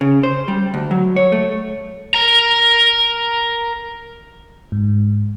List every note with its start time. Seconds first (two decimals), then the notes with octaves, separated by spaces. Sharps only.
0.01 C#3
0.23 C5
0.48 G3
0.74 D2
0.91 F#3
1.16 C#5
1.32 A3
2.15 A#4 A#5
4.72 G#2